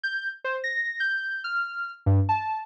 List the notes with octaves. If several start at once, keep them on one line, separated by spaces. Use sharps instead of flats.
G6
C5
A#6
G6
F6
G2
A5